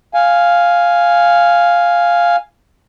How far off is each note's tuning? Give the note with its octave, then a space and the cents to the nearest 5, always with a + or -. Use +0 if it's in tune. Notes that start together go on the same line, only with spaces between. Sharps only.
F5 +0 G#5 +0